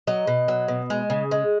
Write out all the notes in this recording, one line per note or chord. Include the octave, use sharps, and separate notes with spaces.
F#3 D#5
B2
F#3
B2
G#3
C#3
G#3